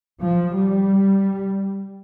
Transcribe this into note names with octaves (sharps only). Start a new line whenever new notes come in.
F3
G3